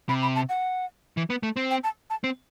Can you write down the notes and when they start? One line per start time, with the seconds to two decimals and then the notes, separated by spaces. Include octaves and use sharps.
0.09 C3 B5
0.22 B5
0.35 A5
0.49 F#5
1.17 E3
1.30 B3
1.43 A3
1.56 C4
1.71 G5
1.84 A5
2.10 A5
2.24 C4